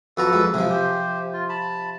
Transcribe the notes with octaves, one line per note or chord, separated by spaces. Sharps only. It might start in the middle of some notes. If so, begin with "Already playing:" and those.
F2 F#4 A4 B4 A#5
F2 G#3
C3 F3 G#4
G4 C5
F4
A5 B5